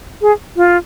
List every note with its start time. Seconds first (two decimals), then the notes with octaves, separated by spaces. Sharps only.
0.22 G#4
0.56 F4